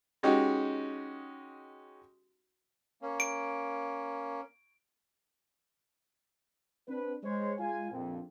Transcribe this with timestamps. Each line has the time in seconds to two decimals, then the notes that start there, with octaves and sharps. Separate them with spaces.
0.23 G#3 C#4 D#4 F#4 G4
3.02 A#3 C#4
3.20 D7
6.88 C4 D4 B4
7.23 G#3 C5 C#5
7.59 G#3 F4 G#5
7.91 A#1 F2